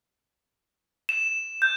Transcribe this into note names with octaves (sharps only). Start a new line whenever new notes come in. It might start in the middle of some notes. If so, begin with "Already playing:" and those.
E7
G6